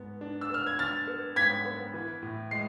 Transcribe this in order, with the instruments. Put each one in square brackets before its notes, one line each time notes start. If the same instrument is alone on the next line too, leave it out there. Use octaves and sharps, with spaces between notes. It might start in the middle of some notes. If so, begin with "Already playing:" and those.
Already playing: [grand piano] G#2 B3
D4
[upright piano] E6
[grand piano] B3 [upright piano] F6
[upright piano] G#6
[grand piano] D4 [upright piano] F6 A6
[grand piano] B3
[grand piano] G#2 [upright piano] G#6 B6
[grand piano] B3
E3
A2
[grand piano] G#3 [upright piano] C7